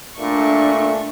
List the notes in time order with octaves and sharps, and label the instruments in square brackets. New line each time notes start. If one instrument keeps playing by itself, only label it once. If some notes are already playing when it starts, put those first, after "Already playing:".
[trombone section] A#2 A3 [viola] D4 C#6